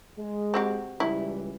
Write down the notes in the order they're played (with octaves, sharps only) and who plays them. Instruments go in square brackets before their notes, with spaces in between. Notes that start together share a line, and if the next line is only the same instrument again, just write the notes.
[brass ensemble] G#3
[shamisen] C4 F#4 G4
[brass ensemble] C#2 E3 G3 [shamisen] E4